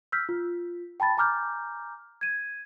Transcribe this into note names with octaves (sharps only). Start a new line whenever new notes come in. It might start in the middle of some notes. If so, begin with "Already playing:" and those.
E6 F6 G6 B6
F4
G5 A5 B5 A6
G#5 A#5 D6 F6 G6
G#6 D#7